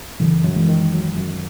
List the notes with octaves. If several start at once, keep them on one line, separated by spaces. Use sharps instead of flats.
F#2 C#3 E3
F#2
E3 G#3
D#3
F#3
F#2